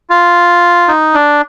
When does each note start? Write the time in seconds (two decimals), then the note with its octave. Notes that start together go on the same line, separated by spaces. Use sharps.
0.10 F4
0.88 D#4
1.14 D4